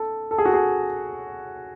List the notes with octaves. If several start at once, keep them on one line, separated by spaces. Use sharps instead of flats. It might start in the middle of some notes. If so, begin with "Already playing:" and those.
Already playing: A4
A4
G#4
F#4
G#4